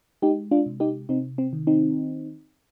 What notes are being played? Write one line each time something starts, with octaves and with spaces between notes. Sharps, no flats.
G#3 D#4 G4
D4 F4
C3
D#4 G4
C3 C4 D#4
C4
D#3
C4 D#4